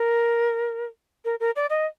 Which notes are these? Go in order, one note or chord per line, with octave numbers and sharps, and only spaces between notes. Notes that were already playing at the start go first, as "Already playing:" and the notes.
Already playing: A#4
A#4
A#4
D5
D#5